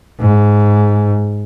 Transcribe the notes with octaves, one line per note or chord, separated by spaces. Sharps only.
G#2